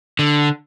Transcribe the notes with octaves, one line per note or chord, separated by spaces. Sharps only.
D3